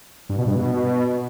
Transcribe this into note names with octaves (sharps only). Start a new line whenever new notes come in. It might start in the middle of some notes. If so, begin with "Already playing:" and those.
G2
B2
G2
B2